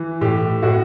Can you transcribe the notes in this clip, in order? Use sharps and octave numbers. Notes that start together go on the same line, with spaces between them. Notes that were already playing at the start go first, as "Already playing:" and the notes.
Already playing: E3
A2 G4
A2 F#4